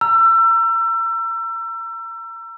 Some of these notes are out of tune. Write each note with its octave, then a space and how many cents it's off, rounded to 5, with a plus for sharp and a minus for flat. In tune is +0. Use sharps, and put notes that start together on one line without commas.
A#5 +0 E6 +30